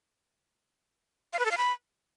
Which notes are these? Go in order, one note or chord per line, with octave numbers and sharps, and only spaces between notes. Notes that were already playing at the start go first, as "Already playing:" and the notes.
F5
B4
A4
F5
B5